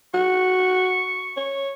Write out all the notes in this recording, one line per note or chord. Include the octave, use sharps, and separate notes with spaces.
F#4 C#6
C#5